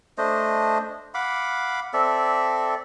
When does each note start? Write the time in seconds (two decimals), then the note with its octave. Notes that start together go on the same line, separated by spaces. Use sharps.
0.18 A3 D4 C5 D#5
1.14 F5 F#5 B5 D6
1.94 C4 A4 D5 E5